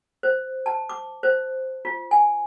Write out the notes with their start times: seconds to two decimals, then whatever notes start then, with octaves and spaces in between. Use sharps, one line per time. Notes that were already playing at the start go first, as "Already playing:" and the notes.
0.23 C5
0.66 A5
0.89 D6
1.23 C5
1.85 F4
2.11 G#5